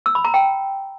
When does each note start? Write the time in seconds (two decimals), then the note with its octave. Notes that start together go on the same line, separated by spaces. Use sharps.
0.06 E6
0.15 B5
0.25 A#5
0.34 G5